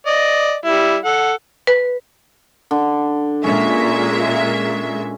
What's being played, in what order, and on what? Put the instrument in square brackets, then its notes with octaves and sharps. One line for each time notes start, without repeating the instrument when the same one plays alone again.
[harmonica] D5 D#5
G3 E4
A4 F#5
[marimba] B4
[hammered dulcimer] D3
[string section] A#2 G#3 E5 [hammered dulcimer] C#4